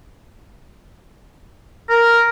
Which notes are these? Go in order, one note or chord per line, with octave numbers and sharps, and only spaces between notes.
A#4